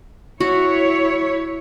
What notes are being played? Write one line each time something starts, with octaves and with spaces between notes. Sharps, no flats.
E4 F#4 C#5